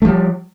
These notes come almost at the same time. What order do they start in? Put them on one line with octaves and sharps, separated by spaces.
A3 F3 G3